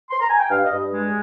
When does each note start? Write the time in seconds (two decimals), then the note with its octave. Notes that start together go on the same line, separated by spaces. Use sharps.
0.11 C6
0.20 A#5
0.30 G#5
0.40 G5
0.50 G2 F5
0.65 D#5
0.72 G2
0.93 G#3